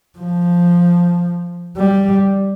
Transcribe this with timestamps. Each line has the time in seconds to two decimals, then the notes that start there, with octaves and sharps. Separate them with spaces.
0.19 F3
1.77 G3